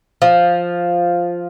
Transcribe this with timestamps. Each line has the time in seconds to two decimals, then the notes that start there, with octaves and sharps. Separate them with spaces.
0.22 F3